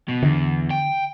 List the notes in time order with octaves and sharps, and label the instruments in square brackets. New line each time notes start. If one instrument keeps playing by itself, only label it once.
[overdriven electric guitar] B2
[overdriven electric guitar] E2 [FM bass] D3
[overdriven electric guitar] G5